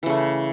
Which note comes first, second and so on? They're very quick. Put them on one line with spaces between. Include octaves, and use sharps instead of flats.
E3 C#3 A3